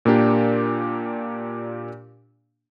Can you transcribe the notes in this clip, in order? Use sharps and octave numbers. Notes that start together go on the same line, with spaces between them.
A#2 A#3 D4 G4